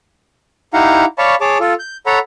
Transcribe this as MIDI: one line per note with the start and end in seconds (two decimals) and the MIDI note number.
0.74 1.05 63
0.74 1.05 64
0.74 1.05 67
0.74 1.05 77
0.74 1.05 78
0.74 1.05 82
1.18 1.35 73
1.18 1.35 74
1.18 1.35 77
1.18 1.35 81
1.18 1.35 83
1.18 1.35 85
1.41 1.58 68
1.41 1.58 73
1.41 1.58 81
1.41 1.58 86
1.60 1.74 65
1.60 1.74 69
1.79 1.97 91
2.06 2.19 69
2.06 2.19 73
2.06 2.19 78
2.06 2.19 82
2.06 2.19 83